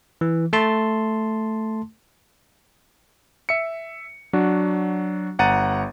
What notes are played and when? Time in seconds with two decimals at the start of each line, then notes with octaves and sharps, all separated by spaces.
0.21 E3
0.53 A3 A5 C6
3.49 E5 C#7
4.33 F#3 D4 F#4
5.39 G1 F#5 A#5 A6 D#7